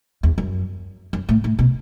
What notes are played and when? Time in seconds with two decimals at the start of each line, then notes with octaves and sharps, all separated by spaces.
0.23 E2
0.38 F#2
1.13 F#2
1.29 A2
1.44 A2
1.59 B2